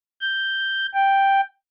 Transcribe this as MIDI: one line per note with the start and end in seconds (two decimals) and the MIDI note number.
0.21 0.86 91
0.94 1.40 79